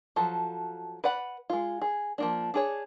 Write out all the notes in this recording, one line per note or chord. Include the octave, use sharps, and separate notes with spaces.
F3 F#3 A4
B4 D5 F#5 B5
G#3 F4
G#4
F3 A#3 D4
D4 G#4 C#5